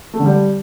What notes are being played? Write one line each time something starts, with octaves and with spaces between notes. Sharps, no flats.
A3
D3
G3